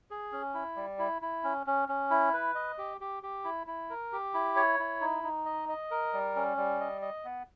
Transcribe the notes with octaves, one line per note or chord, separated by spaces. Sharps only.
G#4
C#4
E4
G3
E4
E4
C#4
C#4
C#4
E4
B4
D#5
G4
G4
G4
E4
E4
A#4
G4
E4
C#5
E4
D#4
D#4
D#5
D#5
A#4
G3
C#4
G3
D#5
D#5
B3